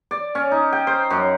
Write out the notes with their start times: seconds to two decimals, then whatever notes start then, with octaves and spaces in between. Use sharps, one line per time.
0.11 D5
0.35 C#4
0.51 D#4
0.73 G5
0.87 C5
1.10 F#2